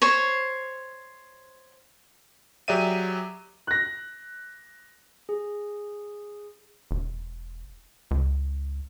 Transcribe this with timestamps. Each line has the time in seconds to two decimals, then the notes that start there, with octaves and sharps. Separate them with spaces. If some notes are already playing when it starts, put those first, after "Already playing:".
0.02 C5 C#5
2.68 F#3 G4 G#4 D5 E5 D#7
3.67 F#6 A#6
5.29 G#4
6.91 E1
8.11 C#2